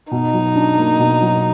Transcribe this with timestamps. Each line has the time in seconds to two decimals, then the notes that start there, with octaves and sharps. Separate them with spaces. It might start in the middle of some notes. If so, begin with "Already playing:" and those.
0.11 B2 D#4
0.33 F#3
0.56 D4
0.78 A#3
0.99 B2
1.22 F#3